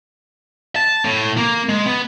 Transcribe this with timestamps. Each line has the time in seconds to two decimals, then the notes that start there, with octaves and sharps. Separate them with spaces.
0.76 A5
1.05 A2
1.37 A#3
1.69 G#3
1.86 B3